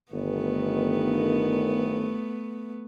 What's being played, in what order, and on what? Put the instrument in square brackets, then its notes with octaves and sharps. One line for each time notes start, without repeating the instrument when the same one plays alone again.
[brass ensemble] G1 D#3 [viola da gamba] A3 B3